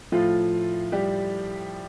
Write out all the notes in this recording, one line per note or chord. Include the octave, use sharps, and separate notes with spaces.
A2 F3 F4
G3 G4